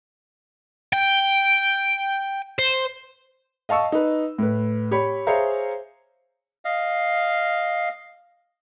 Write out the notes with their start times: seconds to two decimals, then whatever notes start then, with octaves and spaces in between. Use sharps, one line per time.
0.93 G5
2.59 C5
3.69 D#5 F5 A5 C#6 E6
3.92 D#4 B4
4.38 A2 B4
4.91 G4 C#5 B5
5.27 G#4 C5 C#5 E5 F5 A#5
6.65 D#5 F5